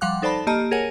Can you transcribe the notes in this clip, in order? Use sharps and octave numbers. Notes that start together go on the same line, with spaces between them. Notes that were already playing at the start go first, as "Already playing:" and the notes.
F3 G3 F5 F#5 D6 F#6
D#4 A4 C5 D5 A5 B5
A#3 G4 D#5 A5 A#5
G#4 A#4 C#5 F#5 G#5